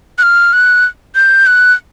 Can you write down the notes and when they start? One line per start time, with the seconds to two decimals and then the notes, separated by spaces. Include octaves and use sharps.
0.18 F#6
0.23 F6
0.53 F#6
1.15 G6
1.46 F#6